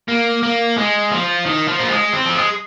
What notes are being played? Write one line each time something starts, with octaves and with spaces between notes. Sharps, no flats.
A#3
A#3
G#3
F3
D#3
F3
A#3
G#3
C4
F3
G#3